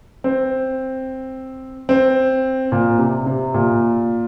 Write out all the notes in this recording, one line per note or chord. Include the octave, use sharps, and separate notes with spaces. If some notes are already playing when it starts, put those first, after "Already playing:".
C4
C4
A#2
C3
C3
A#2